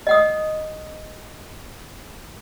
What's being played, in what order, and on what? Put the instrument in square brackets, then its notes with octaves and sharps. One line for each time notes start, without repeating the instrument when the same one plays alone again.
[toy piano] D#5 F#5 D#6